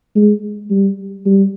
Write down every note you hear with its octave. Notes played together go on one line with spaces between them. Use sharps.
G#3
G3
G3